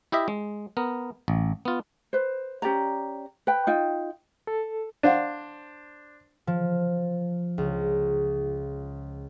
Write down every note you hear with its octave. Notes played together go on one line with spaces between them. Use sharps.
E4 G4 D#5 E5
G#3
B3 A#4
A1
B3 F4
B4 C5
C#4 G4 D5 A#5
B4 G5
D#4 F4 G5
A4
D4 C5 D5 F5 F#5
F3
C#2